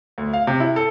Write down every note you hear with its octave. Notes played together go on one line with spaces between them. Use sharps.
D2
F5
C3
E4
A4